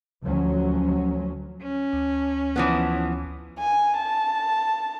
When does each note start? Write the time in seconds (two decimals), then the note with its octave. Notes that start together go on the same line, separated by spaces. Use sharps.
0.23 D2 F3 F#3 C#4
1.63 C#4
1.93 D2
2.56 E3 F3 B3
3.59 G#5
3.98 A5